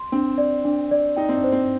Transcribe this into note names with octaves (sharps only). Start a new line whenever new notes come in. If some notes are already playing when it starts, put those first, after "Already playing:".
Already playing: C6
C4 D4
D5
D4
D5
D#4 G5
C4
D4
C5
C4